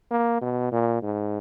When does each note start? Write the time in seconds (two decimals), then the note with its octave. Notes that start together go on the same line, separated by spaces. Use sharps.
0.11 A#3
0.41 B2
0.72 A#2
1.02 G#2